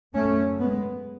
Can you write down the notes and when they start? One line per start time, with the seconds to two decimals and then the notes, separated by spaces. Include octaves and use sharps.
0.15 F#2 C#3 A3 C#4
0.60 G#3 B3